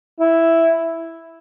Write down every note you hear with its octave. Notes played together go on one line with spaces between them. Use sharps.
E4